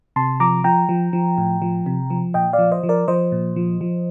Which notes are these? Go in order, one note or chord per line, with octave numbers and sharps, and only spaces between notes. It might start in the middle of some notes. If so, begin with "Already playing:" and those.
C3 A5 C6
F3 A#5 D6
F3 G5 A#5
F3
F3
A2
F3
C3
F3
A#2 D#5 G5
D5 F5
F3
C5 D#5
F3
A#4 D5
F3 C5 D#5
A#2
F3
F3